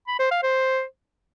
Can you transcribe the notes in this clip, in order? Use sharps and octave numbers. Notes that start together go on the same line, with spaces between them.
B5
C5
F5
C5